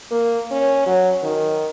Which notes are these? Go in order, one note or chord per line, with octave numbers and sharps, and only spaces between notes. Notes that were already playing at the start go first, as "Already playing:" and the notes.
A#3
C#4
F#3
D#3